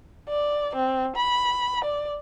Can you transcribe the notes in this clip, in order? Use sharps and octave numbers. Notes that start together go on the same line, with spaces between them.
D5
C4
B5
D5